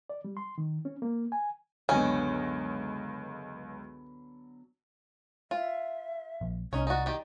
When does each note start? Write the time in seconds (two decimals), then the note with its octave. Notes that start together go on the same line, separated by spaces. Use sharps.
0.10 D5
0.25 G3
0.37 C6
0.58 D#3
0.85 C#4
1.02 A#3
1.32 G#5
1.89 C#2 F#2 D3 F#3 B3 C#4 D#5
5.51 F4 E5
6.41 A#1
6.73 C2 C#4 D#4 C#5
6.87 D#4 F#4 D5
7.06 D#3 G4